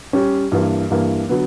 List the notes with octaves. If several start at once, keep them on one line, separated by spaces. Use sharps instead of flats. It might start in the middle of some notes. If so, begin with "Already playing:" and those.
G3 C#4 G4
G2 E3 A#3
G2 E3 A#3
D3 F#3 B3